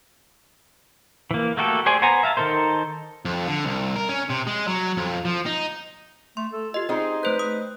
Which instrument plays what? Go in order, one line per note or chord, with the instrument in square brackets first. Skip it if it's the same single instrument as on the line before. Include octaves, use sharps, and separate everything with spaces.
[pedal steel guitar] E3 A#3
A3 A#3 F#4 G4 A4
G4 G#4 C5 D5 G#5
B3 C5 F#5 G#5 A#5
E5 F5 A5
D#3 D#4 A4 A#4 C5
[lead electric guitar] F2
D3
C2
A#4
C#4
C3
G#3
F#3
F2
F3
D#4
[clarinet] A3 [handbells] C6
[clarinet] A4
[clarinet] F4 [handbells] G4 D#5
[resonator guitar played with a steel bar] C4 D#4 [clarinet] G#4
[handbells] A3 C5 G6 [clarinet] B4
[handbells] D#6